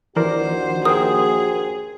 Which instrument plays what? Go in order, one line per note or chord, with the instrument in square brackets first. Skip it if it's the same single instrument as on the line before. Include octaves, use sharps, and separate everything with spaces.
[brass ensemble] A#1 D#2 F#4 [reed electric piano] E3 A#4 D5 [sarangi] C5
[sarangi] G#4 [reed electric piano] A#4 C5 G5 [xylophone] D#6